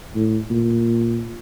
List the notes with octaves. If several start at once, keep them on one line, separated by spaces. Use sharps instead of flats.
A2
A#2